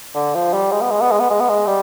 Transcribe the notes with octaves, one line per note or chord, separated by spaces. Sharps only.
D3
F3
G3
G#3
B3
G#3
B3
G#3
B3
G#3
B3
G#3
G3